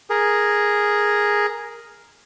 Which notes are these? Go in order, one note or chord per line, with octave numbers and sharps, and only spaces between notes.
G#4 A#4